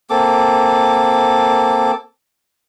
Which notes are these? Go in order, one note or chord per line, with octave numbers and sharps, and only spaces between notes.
A#3 C4 A4 D6